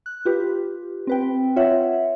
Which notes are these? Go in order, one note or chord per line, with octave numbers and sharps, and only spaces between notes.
F#6
F4 G4 B4
C4 B4 G5
F4 C#5 E5 F#5